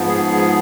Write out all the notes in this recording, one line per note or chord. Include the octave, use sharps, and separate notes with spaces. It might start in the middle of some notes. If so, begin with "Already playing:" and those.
Already playing: G#2 F3 B3
G#4
G#4